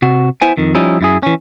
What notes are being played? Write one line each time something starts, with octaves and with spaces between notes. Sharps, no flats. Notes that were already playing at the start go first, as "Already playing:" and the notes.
C3 F#4
B3 E4 C5 G#5
F2 D#3
F3 G3 C#4 D#4 E4
F#2 E4 G#4
E3 C#4